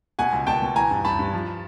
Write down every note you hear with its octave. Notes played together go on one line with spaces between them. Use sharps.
B2 F#5 G#5
C#2
B2 G5 A5
B2
E3 G#5 A#5
G2
G2 A5 B5
G2
F3